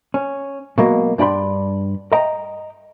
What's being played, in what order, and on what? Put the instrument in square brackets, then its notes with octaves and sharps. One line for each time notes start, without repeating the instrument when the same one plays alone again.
[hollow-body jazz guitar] C#4
B2 F#3 G#3 A#3
G2 D4 D5 G5 B5 C6
D#5 G5 A#5